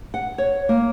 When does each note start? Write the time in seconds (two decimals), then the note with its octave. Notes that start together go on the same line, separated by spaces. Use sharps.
0.14 F#5
0.38 C#5
0.69 A#3